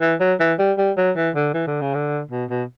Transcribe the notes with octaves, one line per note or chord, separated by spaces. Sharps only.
E3
F#3
E3
G3
G3
F#3
E3
D3
E3
D3
C#3
D3
B2
B2